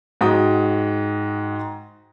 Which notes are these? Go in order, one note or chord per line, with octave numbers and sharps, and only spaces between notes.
G#2 F#4 G5 D#6